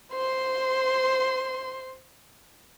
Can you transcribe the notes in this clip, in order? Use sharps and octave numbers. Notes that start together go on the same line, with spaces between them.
C5 C6